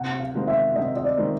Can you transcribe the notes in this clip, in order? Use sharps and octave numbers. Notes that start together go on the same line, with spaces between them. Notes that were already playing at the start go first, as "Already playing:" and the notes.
Already playing: C3 F#5
F5
D#3 G#3 C4
E5
C3 D#5
D#5
D5
D#3 G#3 C4